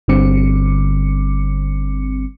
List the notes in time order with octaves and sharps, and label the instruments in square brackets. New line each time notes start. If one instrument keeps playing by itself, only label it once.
[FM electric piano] G1 D3 G3 C4 D6 C#7